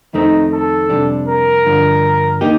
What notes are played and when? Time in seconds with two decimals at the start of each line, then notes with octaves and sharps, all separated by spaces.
0.14 F2 D#3 A3 C4 D#4
0.52 A4
0.89 F2 C3 G3 D4
1.27 A#4
1.65 G2 D3 F3
2.41 D#3 A#3 D#4 G4